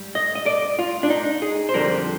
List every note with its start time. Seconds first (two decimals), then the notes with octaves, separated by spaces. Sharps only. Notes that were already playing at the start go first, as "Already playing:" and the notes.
Already playing: G#2 G3
0.15 D#5
0.35 D#5
0.46 D5
0.79 F4
1.03 D4
1.10 D#4
1.42 G#4
1.69 C5
1.74 F2 D3 G3 A#4